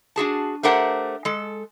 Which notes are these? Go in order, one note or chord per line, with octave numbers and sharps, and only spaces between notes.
D4 F#4 G#4 A5
A3 D4 G4 A#4 C5 F#5
G#3 A4